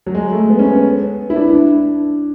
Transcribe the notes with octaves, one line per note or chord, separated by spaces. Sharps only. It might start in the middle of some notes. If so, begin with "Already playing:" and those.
F#3
G#3
A3
B3
C#4
B3
E4
D4
D4